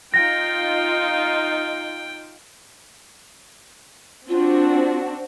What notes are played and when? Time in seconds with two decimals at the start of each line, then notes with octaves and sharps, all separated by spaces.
0.14 D#4 F4 G5 A#6
4.29 C4 D4 F4 F#4